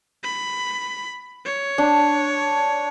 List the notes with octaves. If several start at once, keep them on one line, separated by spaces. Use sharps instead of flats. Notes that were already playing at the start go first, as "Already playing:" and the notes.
B5
C#5
D4